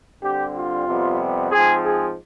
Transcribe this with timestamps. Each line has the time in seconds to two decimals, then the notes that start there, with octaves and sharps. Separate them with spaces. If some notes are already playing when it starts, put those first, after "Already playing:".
0.22 D3 G3 C4 G4
0.54 F4
0.87 F2 C3 G3 B3
1.51 G#2 F3 C4 G#4
1.83 G#4